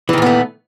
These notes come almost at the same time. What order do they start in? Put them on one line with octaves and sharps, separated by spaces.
E3 D#3 A#2 B3 A3